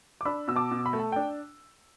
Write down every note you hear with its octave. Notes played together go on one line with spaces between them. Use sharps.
D6
D4 B5 E6
B2 E6
A5 D6
B2
B5
A3
A5
D4 G5